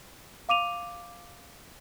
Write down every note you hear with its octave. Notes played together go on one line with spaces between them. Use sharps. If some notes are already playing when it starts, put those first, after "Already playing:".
F5 D6 D#7 F7